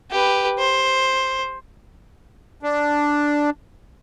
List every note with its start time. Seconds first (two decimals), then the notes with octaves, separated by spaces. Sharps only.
0.11 G4 B4
0.59 C5
2.63 D4